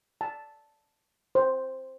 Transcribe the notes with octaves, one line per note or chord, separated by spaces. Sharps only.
A5
C5